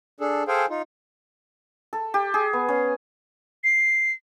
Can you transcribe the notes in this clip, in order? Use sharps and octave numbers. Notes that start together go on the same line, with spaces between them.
D4 G#4 A4
G#4 A4 C5 F5 G5 G#5
D#4 F4
A4
G4
G#4
B3
C#4
C7